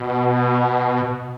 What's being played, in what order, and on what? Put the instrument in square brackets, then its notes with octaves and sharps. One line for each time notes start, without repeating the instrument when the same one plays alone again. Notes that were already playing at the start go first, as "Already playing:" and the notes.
Already playing: [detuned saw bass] B2